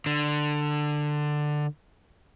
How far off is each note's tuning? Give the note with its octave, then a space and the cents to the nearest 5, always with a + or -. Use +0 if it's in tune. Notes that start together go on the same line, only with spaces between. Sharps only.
D3 +15